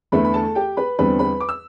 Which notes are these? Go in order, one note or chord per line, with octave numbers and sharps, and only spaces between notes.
E2 D3 A3 B4 B5
B5
A4 A5
G4 G5
B4 B5
E2 D3 G3 C4 B4 B5
B4 B5
D6
E6